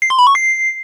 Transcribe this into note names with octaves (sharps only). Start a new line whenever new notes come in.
C7
C6
B5
C#6
C7